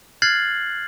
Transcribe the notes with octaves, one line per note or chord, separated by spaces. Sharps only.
F6 F#6 G#6 A6 C7 F#7